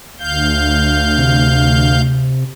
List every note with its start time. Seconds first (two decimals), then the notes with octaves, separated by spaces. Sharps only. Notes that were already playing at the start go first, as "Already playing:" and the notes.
0.19 D2 F5 G6
1.18 C3